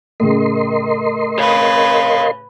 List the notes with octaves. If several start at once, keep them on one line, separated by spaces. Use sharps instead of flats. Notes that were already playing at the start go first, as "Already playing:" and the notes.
A2 C#3 A#4 D#5 C6
B4 C#5 F5